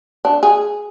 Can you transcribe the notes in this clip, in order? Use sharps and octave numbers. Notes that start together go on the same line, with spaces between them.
D4
G#4